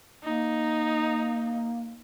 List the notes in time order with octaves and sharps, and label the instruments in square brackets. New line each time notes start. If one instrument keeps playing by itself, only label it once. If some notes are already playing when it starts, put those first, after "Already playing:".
[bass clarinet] A#3 [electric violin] D#4